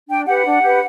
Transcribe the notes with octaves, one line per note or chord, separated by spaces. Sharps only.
D4 G5
G4 B4 F#5
D4
G4 B4